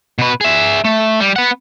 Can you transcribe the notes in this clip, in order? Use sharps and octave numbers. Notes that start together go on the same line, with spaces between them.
B2 B4
G#4 E5
A3
G3
B3 F#5